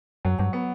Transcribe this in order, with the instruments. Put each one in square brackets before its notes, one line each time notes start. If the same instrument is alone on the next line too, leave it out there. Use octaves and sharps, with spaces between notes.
[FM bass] F#2 [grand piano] F#3
[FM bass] G2 [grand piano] F#3
[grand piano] B3